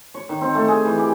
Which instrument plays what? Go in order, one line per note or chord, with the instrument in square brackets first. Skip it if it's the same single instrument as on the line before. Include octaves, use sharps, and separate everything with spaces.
[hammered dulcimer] C#5
D#3
C4
A3
G#4
E3
G4